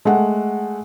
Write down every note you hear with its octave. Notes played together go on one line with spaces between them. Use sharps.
G#3 A3 F#5